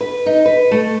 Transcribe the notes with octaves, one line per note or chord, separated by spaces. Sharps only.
B4
D#4
B4
A3